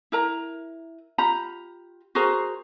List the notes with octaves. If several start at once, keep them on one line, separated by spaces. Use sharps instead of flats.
E4 A#4 A#5
F4 G4 A#5 B5
F#4 G#4 A#4 C5